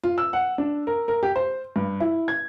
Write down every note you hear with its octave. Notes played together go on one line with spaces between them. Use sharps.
F4
E6
F#5
D4
A#4
A#4
G4
C5
G2
E4
G#6